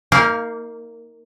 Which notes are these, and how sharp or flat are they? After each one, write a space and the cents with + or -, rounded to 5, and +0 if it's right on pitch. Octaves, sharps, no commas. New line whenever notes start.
A#3 -10 D#4 +30 F5 +0